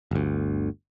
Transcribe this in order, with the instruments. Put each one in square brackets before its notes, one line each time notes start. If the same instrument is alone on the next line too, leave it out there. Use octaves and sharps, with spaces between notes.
[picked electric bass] G1 D2